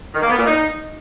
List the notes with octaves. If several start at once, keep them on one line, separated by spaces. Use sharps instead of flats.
D#3
A#3
B3
A#2
D#4